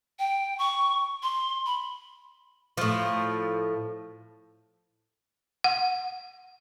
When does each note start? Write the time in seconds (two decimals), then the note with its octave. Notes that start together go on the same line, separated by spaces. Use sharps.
0.19 G5
0.58 C#6
1.23 C6
1.66 B5
2.77 A2 F3
5.64 F#5